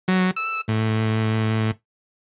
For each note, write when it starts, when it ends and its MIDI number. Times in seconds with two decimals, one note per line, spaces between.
0.08 0.31 54
0.36 0.61 88
0.68 1.71 45